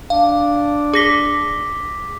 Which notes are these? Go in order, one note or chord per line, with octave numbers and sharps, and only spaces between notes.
D4 F5
G#4 D6 A#6 B6 G7